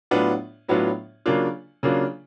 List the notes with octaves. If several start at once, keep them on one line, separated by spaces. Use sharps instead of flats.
A2 F#3 B3 D4 F4
A2 F#3 B3 D4 F4
C#3 F#3 A#3 D4 F4
C#3 F#3 A#3 D4 F4